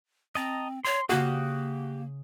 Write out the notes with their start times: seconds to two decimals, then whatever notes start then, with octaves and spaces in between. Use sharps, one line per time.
0.35 C4 D#5 A5 A#5
0.85 C#5 C6
1.09 C#3 A#3 F#4 G4 D#6